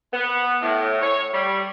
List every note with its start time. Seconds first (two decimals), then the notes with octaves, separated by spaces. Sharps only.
0.13 B3
0.62 A2
1.02 C#5
1.33 G3